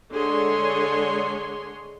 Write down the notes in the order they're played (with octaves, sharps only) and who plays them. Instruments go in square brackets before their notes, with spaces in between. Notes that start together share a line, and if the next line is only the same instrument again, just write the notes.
[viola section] D3 G#3 G#4 C#5 C6